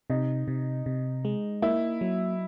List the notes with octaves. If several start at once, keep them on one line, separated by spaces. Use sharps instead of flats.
C3 D#4
C3
C3
G#3
A#3 E4
F#3